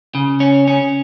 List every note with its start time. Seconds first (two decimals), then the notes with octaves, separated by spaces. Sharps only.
0.15 C#3
0.40 C#4
0.68 C#4